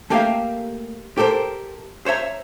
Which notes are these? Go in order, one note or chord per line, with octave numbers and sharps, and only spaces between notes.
A3 A#3 G4 A#4 E5 F5
G4 A4 A#4 C5
C5 C#5 E5 A#5